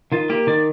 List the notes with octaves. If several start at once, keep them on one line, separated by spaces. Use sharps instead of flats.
D#3 F4
A#3 G4
D#3 D5